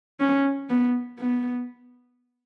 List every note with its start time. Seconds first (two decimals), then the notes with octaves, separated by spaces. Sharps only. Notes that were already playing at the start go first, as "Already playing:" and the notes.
0.20 C#4
0.69 B3
1.19 B3